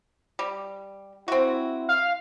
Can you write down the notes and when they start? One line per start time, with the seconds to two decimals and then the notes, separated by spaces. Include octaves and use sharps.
0.39 G3
1.28 C4 E4 F#4
1.89 F5